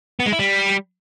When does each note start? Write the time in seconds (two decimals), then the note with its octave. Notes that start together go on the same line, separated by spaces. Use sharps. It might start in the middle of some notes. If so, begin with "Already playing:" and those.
0.20 B3
0.26 G#3
0.32 E4
0.39 G3